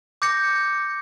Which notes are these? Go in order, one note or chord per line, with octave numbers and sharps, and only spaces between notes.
D6 G6 A#6 C#7